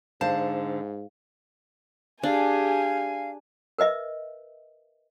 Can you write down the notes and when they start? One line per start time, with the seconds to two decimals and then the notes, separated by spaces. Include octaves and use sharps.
0.21 G#2 D3 C5 F5 A5
2.23 D4 G4 G#4 F5 G#5
3.78 A#4 B4 D#5 E5